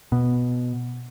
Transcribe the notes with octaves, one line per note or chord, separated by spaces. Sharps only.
B2